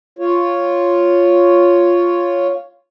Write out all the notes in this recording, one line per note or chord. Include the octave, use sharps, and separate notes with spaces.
F4 C#5